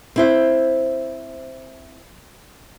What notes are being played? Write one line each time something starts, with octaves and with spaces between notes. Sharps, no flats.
C4 E4 C5